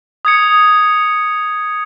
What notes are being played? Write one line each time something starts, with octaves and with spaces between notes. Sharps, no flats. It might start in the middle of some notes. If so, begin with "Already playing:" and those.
D#6 G#6 C#7